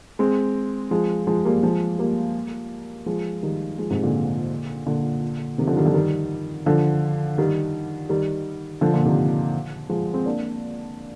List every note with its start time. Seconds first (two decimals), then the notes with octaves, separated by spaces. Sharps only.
0.19 G#3 C4
0.91 F3 G#3
1.27 F3 G#3
1.45 G3 A#3
1.63 F3 G#3
1.99 G3 A#3
3.06 F3 G#3
3.43 D#3 G3
3.78 F3 G#3
3.90 G#2 C3
4.03 A#2 D3
4.86 A#2 D3
5.58 C3 D#3
5.67 D3 F3
5.77 D#3 G3
5.86 D3 F3
5.94 D#3 G3
6.66 D3 F3
7.38 D#3 G3
8.09 D#3 G3
8.81 D3 F3
8.94 A#2 D3
9.06 C3 D#3
9.89 F3 G#3
10.14 G#3 C4
10.26 A#3 D4